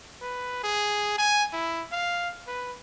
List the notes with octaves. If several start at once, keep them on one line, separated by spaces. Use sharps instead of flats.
B4
G#4
G#5
E4
F5
B4